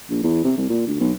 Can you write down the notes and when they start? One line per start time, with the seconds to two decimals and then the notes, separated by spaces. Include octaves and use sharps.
0.10 A#1
0.24 E2
0.44 C3
0.58 C2
0.69 A#2
0.87 D2
1.00 B1